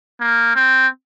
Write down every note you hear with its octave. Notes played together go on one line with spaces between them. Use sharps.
A#3
C4